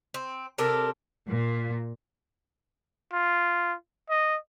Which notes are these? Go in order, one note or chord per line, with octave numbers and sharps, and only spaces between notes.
C4
C3 D4 A4 A#4
A#2
F4
D#5